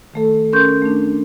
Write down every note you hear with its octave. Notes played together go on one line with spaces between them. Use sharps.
D#3 A3 A4
C#4 A#4 C6 C#6 G6
A3 D4